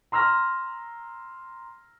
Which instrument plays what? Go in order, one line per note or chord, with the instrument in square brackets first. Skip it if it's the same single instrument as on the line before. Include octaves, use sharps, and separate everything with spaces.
[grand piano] A#5 C6 E6 F6 A#6